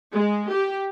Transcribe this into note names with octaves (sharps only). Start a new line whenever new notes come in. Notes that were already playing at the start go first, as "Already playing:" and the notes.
G#3
G4